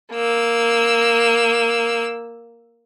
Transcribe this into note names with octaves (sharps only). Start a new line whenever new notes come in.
A#3 E6